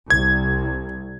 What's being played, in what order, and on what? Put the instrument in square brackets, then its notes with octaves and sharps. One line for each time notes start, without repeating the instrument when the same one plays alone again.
[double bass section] C2 [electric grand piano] G#6